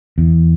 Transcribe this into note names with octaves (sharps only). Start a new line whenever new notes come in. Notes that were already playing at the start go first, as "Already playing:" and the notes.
E2